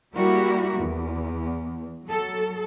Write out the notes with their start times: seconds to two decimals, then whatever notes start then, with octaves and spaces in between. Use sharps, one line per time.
0.14 G3 A#3 E4 F#4 G4 A#4
0.78 E2
2.06 F#3 A4